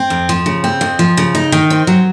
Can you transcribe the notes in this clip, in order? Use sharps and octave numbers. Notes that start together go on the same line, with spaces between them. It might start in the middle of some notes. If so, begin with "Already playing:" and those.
Already playing: C4
F2
F3
C#3
C4
F2
F3
C#3
D#4
D#3
C4
F#3